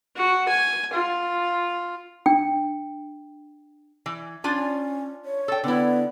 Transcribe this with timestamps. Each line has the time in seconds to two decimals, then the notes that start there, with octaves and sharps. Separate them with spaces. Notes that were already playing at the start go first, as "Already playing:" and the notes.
0.16 F#4
0.49 G#5
0.93 F4
2.26 D4 G5
4.06 E3
4.44 C#4 D4 F4 G#5
5.25 C#5
5.48 A4 G5
5.64 D3 B3 E4